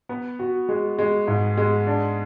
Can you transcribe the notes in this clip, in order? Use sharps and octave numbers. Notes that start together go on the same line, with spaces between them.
B3
F#4
G#3
G#3
G#2
G#3
D4